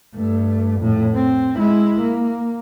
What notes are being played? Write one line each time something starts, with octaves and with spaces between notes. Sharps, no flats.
G2 A3
F2 A2
C4
G#3 E4
A#3